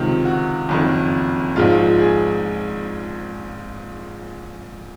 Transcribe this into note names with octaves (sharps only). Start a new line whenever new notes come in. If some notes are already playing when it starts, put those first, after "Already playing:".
Already playing: C#2 C3 D#3 F4
F#4
F#1 F2 D#3
A#1 G#2 F3 G#3 F4
F4
G#4